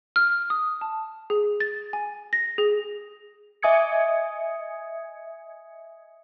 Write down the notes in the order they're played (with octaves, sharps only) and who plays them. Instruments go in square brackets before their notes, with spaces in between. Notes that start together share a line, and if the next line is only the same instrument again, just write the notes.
[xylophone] F6
D#6
A5
G#4
A6
G#5
A#6
G#4
[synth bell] D#5 E5 G#5 D#6 G#6 C#7